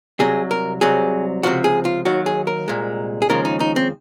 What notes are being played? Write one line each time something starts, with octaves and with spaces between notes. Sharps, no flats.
C2 C3 F#3 G#4
A#4
C2 C3 F#3 G#4
C#2 C3 F3 F#4
G#4
F4
D#2 D#3 F#3 F#4
G#4
A#4
C2 A#2 G#3
G#4
D#2 C#3 F3 G#3 A#4
D#4
D#4
C4